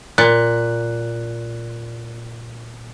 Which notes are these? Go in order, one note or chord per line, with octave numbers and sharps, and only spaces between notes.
A#2 F#6